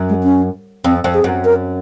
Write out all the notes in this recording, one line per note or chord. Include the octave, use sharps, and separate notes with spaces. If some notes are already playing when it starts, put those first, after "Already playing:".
Already playing: F#2
G#3
C#4
F2 C4
F2
G#4
F#2
A#4